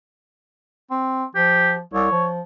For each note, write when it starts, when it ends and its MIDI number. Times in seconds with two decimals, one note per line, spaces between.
0.91 1.24 60
1.35 1.80 53
1.35 1.71 67
1.94 2.11 36
1.94 2.25 73
2.12 2.41 53